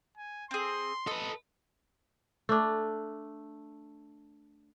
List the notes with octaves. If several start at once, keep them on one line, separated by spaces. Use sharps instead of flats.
G#5
C4 G#4 C6
A4 B4 D#5
A3 D4